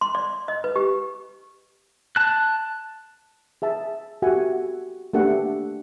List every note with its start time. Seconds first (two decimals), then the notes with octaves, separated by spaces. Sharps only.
0.01 C6
0.15 D5
0.48 D#5
0.64 B4
0.76 G4
2.16 A5 F#6
3.62 G#4 E5 A5
4.22 F#4 G4 A4 E5 F#5 G#5
5.13 A3 A#3 D4 G4 A4 F#5